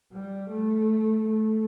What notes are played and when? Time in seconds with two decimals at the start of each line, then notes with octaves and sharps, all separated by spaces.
0.12 G3
0.50 A3
1.29 A3